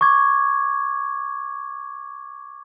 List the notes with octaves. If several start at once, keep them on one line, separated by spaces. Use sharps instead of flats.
C#6 D6 G#6